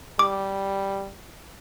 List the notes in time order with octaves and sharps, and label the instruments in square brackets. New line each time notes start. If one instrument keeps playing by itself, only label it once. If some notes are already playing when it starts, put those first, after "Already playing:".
[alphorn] G3 [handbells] D6